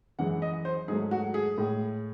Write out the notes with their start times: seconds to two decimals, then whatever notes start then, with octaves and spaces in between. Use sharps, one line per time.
0.19 F#2 E3 G#3 F#5
0.42 D#5
0.65 C5
0.88 G#2 F#3 A3 G#4
1.11 F#4
1.34 G#4
1.58 A2 G#3